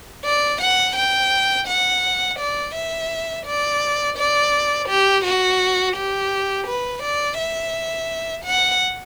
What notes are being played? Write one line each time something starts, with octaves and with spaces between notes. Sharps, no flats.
D5
F#5
G5
F#5
D5
E5
D5
D5
G4
F#4
G4
B4
D5
E5
F#5